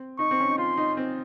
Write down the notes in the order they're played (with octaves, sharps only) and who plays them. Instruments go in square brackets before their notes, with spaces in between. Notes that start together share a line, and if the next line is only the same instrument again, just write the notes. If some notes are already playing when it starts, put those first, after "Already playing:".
Already playing: [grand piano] C4
[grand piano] D#4 [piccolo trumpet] C#6
[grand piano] C4
C#4
D#4
[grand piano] F4 [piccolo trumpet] C6
[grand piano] D#4
C4